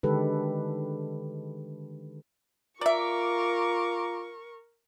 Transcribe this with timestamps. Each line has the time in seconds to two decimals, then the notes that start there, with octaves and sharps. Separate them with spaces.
0.03 D3 D#3 G#3 G4 A4 B4
2.81 F4 A#4 D5 E5 A#5 C#6 D6